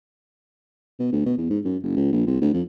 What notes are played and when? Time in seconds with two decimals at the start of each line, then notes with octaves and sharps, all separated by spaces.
1.00 B2
1.12 D2
1.26 B2
1.38 E2
1.50 G#2
1.65 F#2
1.83 F#1
1.97 C#2
2.13 A#1
2.27 C2
2.41 D2
2.54 F2